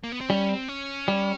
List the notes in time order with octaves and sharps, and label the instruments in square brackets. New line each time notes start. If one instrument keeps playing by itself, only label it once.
[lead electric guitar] A#3
B3
C4
[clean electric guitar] G3 [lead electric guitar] C#4
[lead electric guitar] C4
C#4
[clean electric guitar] G3